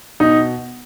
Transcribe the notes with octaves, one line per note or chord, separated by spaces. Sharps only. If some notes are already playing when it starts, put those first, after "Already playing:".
B2 D#4